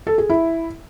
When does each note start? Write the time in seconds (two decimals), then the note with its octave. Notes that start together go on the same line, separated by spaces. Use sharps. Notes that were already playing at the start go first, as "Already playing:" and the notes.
0.07 A4
0.18 G#4
0.30 E4